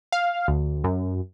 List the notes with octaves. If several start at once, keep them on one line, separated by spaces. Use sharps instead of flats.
F5
D2
F#2